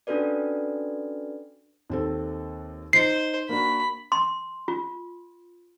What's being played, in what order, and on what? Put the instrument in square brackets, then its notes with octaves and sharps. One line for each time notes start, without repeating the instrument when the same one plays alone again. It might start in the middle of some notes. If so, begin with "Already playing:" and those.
[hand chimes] C#4 D4 F#4 A4 B4 D5
[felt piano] D#2 C4 A4
[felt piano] D#4 [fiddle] C5 [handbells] C7
[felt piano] A#3 D4 F#4 [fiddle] B5
[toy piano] C6
F4